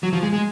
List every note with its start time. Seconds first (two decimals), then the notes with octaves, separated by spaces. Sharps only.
0.03 F#3
0.13 F3
0.22 G#3
0.33 G#3